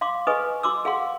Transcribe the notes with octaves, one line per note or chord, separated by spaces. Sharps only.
F5 C6 D6
G#4 B4 D#5 G#5 C#6 D#6
F#4 C6 D6 E6
G#4 F5 F#5 C6